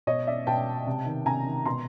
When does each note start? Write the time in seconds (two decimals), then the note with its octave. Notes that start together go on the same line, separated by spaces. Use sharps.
0.07 B2 C#5 D#5
0.27 D5 E5
0.47 B2 G5 A5
0.87 C3
1.06 D#3
1.26 C3 G#5 A#5
1.47 D#3
1.66 B2 A#5 C6